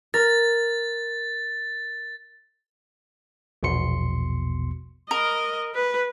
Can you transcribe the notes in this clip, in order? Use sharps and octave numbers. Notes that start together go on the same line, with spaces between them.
A#4 A6
A#1 E2 B2 C6 C#7
A#4 D#5
B4